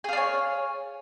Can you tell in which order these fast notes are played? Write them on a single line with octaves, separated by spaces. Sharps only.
G#4 F5 D5 C#5